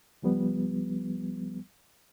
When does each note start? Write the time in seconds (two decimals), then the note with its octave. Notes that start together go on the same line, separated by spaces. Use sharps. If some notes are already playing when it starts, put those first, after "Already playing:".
0.22 C#2 F3 G3 B3